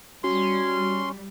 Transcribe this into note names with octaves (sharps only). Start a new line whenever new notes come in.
G3 C#4 F#4 C6